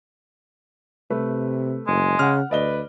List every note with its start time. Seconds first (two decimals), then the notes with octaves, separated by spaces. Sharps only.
1.10 C3 A3 B4
1.87 F#1 G#3
2.19 C#3 F#5 F6
2.51 D2 B4 D5 D#5 G7